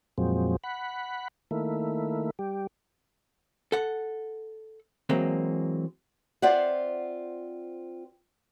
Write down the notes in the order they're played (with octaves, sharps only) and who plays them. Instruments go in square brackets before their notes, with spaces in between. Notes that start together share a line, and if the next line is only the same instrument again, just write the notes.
[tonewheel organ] F2 A#2 F3 F#3 G#3 C4
F#5 B5
D#3 A3 A#3 E4
G3 G4
[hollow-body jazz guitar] A4 F#5
E3 F#3 G#3 A#3 C4
[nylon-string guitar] C4 F4 C5 D5 E5 F#5